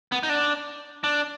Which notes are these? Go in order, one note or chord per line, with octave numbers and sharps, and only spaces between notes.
B3
D#4
D4
D4